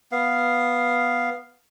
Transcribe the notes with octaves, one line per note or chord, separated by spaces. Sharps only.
B3 F5